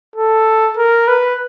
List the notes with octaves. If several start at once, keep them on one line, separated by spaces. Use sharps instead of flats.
A4
A#4
B4